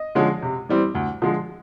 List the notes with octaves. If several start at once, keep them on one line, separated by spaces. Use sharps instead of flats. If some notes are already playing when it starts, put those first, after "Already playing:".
Already playing: D#5
D3 F3 G#3 C#4
C3
E3 G3 C4
D2
D3 F3 G#3